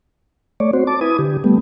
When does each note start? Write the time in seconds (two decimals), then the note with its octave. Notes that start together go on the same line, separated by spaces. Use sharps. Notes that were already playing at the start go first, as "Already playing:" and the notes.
0.60 A3 C#5 D5
0.73 C4 F#4 C5
0.87 A5 D6
1.01 E4 B4 G#5 D#6
1.19 D3 G4
1.44 G3 A3 B3